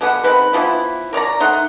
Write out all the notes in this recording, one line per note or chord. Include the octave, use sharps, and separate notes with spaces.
D3 G#3 B3 F#5
D#3 G#3 C4 B4
E3 F3 B3 E4
A#4 C#5 D5 A#5
A3 D#4 F#5 C6